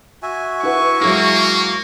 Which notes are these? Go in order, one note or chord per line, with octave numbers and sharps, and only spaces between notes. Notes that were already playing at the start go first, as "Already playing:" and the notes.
F#4 E5 G#5
E4 B4 F#5 C#6
F#3 G#3 A#3 E4